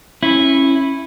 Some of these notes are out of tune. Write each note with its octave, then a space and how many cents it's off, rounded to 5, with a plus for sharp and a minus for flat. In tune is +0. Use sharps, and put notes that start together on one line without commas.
C#4 -25 E4 +0